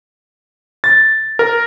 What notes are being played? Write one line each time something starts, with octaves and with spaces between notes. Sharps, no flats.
A6
A#4